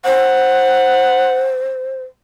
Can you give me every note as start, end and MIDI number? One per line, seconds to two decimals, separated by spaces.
0.05 2.03 72
0.05 1.54 78